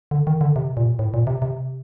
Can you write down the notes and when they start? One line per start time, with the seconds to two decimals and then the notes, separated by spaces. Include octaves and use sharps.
0.11 D3
0.27 D#3
0.41 D3
0.56 C3
0.77 A#2
0.99 A2
1.14 A#2
1.27 C3
1.42 C3